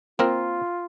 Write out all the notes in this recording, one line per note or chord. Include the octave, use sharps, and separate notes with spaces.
A#3 C4 F4 A#4